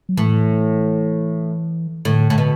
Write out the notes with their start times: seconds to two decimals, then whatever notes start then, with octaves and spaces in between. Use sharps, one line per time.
0.09 F#3
0.17 A2 E3
2.05 A2 D3
2.30 A2
2.38 B2